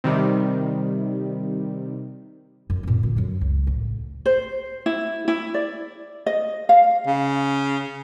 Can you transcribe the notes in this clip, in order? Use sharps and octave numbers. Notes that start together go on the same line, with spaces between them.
C3 D#3 G3
F#2
A#2 C4
D2
F#2 F#3
C#2
A1
C5
E4
E4
D5
D#5
F5
C#3